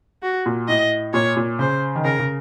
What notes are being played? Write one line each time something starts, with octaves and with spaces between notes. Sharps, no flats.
F#4
A#2
A2 D#5
A#2 C#5
A#2
C#3 C5
D#3
C#3 A#4
C#3